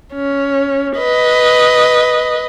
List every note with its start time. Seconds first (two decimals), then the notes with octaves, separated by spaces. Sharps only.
0.14 C#4
0.97 B4 D#5